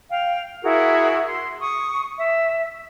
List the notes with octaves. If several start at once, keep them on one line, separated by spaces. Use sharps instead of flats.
F5 G5
E4 F#4 G#4 A#4
C6
C#6 D#6
E5